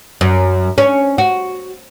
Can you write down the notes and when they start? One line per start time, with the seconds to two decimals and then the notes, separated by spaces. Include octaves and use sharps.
0.21 F#2
0.78 C#4
1.18 F#4